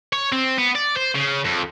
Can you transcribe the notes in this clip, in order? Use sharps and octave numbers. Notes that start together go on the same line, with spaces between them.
C#5
C4
B3
D5
C5
C#3
F2